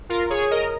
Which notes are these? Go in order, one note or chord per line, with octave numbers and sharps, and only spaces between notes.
F4 A#4
G#4 C#5
A#4 D#5